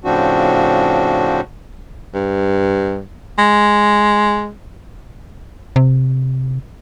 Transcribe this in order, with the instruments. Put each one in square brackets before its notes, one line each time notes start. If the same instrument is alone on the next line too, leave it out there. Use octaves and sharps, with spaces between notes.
[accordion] A2 C#3 F3 C4 D4 F#4
[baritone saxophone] G2
G#3
[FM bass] C3